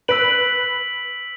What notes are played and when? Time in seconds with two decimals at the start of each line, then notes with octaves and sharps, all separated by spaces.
0.08 B4 E6 B6 D7 F#7